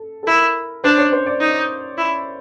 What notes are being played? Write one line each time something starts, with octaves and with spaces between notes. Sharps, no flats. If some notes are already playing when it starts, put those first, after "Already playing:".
Already playing: A4
A4
E4 A#4
D4 C5
C#5
C5
D5
D#4
E4